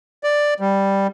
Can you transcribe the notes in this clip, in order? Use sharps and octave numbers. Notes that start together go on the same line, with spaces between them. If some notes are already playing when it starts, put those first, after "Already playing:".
D5
G3